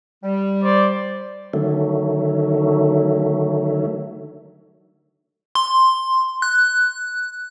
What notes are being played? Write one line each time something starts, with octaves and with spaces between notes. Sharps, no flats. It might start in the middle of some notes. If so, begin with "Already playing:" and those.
G3
C5 D5
D3 D#3 F#3 A3
C6
F#6